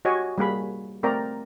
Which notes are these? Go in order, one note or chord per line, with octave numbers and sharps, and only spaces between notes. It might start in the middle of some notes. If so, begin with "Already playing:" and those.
F#4 G4 C#5 D#5 G#5
G3 A#3 G#4 B5
A3 C4 A#4 D5 G5 A#5